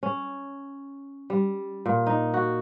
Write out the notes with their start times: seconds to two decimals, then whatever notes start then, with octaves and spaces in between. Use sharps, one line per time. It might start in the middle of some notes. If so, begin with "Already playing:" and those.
0.03 C#4
1.30 G3
1.86 A#2
2.06 D#4
2.34 F#4